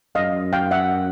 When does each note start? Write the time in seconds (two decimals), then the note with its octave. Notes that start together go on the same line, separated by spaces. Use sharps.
0.15 F#2 D#5 F5
0.53 F5 G5
0.71 E5 F#5